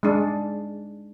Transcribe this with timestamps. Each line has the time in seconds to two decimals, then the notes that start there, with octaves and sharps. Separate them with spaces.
0.03 G#3 D4